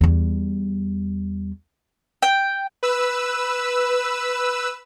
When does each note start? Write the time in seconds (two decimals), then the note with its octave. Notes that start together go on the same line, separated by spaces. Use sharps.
0.01 E2 G3
2.22 G5
2.83 B4 E6